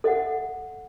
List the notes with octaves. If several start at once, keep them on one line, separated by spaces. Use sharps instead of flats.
A4 D#5 E5 F#5